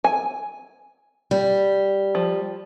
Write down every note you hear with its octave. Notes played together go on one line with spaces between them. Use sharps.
G#5
G3
F3